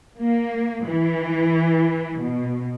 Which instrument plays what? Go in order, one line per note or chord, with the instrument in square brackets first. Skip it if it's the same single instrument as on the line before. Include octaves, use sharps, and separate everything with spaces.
[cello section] A#3
E3
B2